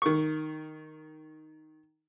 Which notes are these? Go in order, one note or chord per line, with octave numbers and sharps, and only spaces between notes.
D#3 C#6